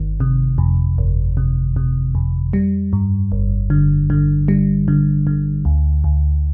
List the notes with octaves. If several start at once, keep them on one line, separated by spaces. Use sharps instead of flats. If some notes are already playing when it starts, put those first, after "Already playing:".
Already playing: G1 D#3
C3
F2
G1
C3
C3
F2
G3
G2
G1
D3
D3
G3
D3
D3
D2
D2